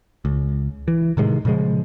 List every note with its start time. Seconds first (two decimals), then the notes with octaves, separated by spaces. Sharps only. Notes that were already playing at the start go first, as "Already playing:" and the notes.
0.25 C#2
0.88 E3
1.17 A2 C3 D#3 G#3
1.45 A#2 C#3 F3 G#3